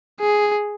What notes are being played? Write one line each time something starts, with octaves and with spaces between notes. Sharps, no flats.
G#4